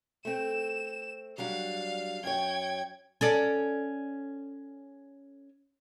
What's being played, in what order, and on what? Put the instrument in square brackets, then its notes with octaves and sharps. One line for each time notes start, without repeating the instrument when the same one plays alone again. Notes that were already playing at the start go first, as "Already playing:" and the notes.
[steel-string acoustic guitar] A3 C4 [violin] E7
[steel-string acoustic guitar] F#3 G3 D4 [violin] F5
[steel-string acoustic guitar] F#2 C#5 [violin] G5 G#6
[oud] C#4 A4 D5